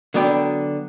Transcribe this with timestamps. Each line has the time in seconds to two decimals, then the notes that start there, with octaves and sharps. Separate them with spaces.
0.14 D3 F#3 B3 D5 G5